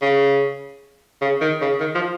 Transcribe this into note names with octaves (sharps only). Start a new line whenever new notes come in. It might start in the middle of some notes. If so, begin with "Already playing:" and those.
C#3
C#3
D#3
C#3
D#3
F3